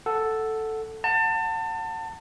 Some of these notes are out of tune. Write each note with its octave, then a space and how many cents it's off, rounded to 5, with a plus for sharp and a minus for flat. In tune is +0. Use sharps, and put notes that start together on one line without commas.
A4 +0 F#5 +0
F#5 +0 A5 +30